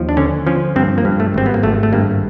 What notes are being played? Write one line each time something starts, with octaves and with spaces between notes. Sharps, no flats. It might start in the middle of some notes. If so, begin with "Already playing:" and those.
Already playing: D#2 F3
D4
D3 C#4
F3 C#4
G2 C4
A#3
G2
A3
G#1 C4
B3
A#3
G#1 A3
A3
G2 A#3